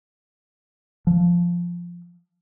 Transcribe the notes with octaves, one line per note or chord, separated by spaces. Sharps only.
F3